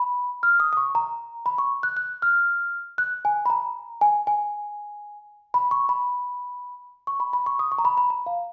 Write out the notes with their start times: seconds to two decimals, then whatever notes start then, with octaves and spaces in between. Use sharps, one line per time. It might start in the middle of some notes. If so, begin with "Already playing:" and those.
Already playing: B5
0.43 F6
0.60 D#6
0.73 D#6
0.77 C#6
0.95 A#5
1.46 B5
1.58 C#6
1.83 F#6
1.97 F#6
2.22 F6
2.98 F#6
3.25 G#5
3.46 B5
3.50 A#5
4.01 G#5
4.27 G#5
5.54 B5
5.71 C#6
5.89 B5
7.07 C#6
7.20 B5
7.33 B5
7.46 C#6
7.59 D#6
7.72 C#6
7.78 A#5
7.85 B5
7.97 B5
8.10 A#5
8.26 F5